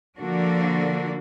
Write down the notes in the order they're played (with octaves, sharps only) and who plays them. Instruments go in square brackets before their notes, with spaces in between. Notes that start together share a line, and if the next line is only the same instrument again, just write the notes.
[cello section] D3 F3 A#3 D4 F#4